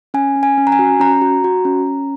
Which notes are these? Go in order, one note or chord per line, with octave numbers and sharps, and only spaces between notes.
C#4 G#5
C#4
G#5
C#4
A#5
G#5
F#4
C#4 A#5
F#4
F#4
C#4
C#4